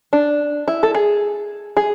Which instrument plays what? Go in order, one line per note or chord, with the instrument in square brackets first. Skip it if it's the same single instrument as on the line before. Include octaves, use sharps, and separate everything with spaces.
[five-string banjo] D4
E4
A4
G#4
G#4